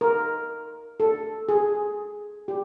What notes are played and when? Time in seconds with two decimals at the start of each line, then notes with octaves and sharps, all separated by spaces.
0.01 A#4
1.00 A4
1.49 G#4
2.48 G4